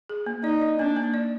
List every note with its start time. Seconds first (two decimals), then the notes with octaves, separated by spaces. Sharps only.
0.09 G#4
0.26 A#3
0.43 D#4 D5
0.62 D5
0.79 A#3 D4
0.97 A#3
1.14 D5